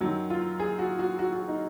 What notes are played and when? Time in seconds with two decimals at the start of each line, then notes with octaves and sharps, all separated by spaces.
0.01 F#2 D#3 F#3
0.30 F4
0.59 G#4
0.79 F#4
0.99 F#4
1.19 F#4
1.33 F#4
1.48 D#4